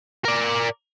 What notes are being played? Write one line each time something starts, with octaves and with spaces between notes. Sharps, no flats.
A#4 D5